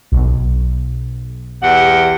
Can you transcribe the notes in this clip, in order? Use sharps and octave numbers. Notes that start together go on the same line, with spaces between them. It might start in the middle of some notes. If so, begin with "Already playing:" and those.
B1
E2 G4 F#5